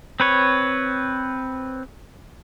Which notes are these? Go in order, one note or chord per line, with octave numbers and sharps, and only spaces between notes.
C4 B4 C#5